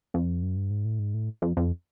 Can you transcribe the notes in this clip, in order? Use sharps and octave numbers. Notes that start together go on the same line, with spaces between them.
F2
F#2
G2
G#2
A2
G#2
A2
F2
F2